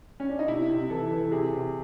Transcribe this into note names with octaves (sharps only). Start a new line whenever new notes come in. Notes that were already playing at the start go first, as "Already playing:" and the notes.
C#4
D4
D#4
C3 E4
C3
E3 A4
E3
C3 G#4
C3